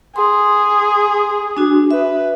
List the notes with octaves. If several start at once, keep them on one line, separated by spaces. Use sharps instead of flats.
G#4 C6
D4 F#4
B4 E5